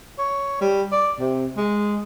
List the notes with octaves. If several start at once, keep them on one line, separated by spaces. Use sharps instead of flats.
C#5
G3
D5
C3
G#3